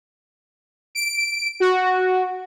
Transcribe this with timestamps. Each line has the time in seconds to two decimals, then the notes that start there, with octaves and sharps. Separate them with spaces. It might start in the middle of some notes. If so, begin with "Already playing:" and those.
0.95 D7
1.60 F#4